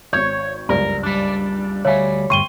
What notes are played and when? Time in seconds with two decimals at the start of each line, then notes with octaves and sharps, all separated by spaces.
0.13 G#1 C#5 C#6 G6 G#6
0.69 F#1 C#2 G2 A#4 D5
1.03 G3 D4
1.85 D2 G3 C#5 E5 F5 G#5
2.30 D2 G2 G5 C6 C#6 D#7 G7